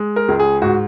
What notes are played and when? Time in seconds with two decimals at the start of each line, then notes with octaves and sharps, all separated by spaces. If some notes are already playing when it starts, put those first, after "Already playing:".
Already playing: G#3
0.16 A#4
0.28 C#2
0.40 G#4
0.62 G#2 F#4